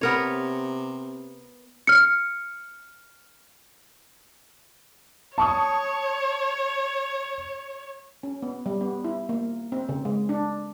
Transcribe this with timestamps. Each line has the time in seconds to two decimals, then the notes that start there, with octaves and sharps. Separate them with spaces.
0.01 C3 B3 A#4 C#5
1.87 F6 C#7
5.38 C#5 A5 C#6 D#6
8.23 C#4
8.42 B3
8.66 G3
8.81 B3
9.04 E4
9.29 A#3
9.72 C4
9.89 C#3
10.05 G#3
10.29 D4